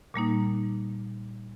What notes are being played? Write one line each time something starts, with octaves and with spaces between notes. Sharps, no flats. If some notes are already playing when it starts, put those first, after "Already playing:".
A#2 G3 A#3 D#4